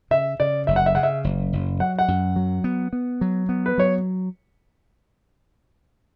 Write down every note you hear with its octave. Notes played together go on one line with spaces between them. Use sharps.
C#3 E5
C#3 D5
F#1 E5
F#5
E5
C#3 F#5
E5
F#1
F#1
F#3 F#5
F#5
F#2
F#3
B3
B3
F#3
B3
B4
F#3 C#5